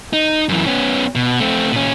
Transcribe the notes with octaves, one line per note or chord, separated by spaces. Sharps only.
D#4
F#2 E3
B3 C#4
B2
A3 C4
A#2 C#4